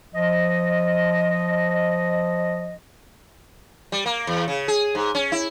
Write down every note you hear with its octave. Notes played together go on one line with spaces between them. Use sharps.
F3 D#5
G3
A#3
E2
C#3
G#4
G#2
C#4
E4